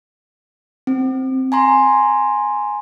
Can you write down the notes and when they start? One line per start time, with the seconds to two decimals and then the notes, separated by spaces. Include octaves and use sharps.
0.87 C4
1.52 G#5 A#5 C6